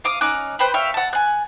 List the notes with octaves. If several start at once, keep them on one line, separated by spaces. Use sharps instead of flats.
F5 D6 D#6
C#4 D#4 D6 F#6
B4 C5 G5 B5
C#5 E5 F5 G5
F#5 A5
G#5 F#6